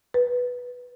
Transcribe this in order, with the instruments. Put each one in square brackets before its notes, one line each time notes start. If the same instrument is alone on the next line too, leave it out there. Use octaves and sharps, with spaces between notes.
[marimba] B4